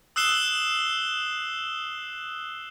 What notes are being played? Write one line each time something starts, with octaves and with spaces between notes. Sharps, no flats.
D#6 E6 F#6 C7 E7 G7